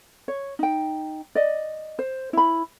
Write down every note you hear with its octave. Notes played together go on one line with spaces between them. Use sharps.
C#5
D#4 G5
D5 D#5
C5
E4 B5